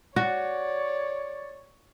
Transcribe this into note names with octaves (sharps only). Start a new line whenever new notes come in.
F#4 C#5 D5